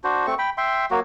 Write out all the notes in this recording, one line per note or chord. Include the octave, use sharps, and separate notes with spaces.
D4 F#4 C5
A3 C4 C#6
G5 B5
E5 G5 C6
F#3 A#3 F#4